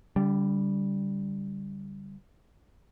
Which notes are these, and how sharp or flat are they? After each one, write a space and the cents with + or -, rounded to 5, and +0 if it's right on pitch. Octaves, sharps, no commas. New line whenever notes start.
D3 -35 G3 +0